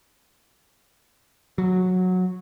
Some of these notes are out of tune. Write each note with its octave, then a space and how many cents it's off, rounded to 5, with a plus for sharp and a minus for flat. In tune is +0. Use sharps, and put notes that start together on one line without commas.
F#3 -10